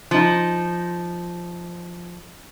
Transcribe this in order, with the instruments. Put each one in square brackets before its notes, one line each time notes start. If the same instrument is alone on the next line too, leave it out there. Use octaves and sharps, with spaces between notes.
[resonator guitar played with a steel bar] F3 D#4